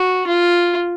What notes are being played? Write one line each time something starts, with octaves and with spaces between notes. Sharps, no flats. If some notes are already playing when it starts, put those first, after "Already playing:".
Already playing: F#4
F4